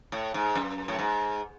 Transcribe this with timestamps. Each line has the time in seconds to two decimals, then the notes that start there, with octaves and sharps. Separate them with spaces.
0.12 A2
0.34 G#2
0.55 F#2
0.88 A2
0.99 G#2